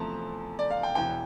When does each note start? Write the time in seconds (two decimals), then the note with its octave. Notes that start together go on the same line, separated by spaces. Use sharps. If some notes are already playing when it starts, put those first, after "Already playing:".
Already playing: E2 C3 F3 A3 C4 A5 A#5 C6
0.59 D5
0.71 F5
0.83 G5
0.95 E1 E2 E3 G5